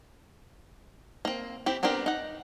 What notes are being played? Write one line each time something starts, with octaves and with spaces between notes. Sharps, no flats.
A#3 C4
C4 E4 G4
B3 C4 D4 G4 A#4
D#4 F#5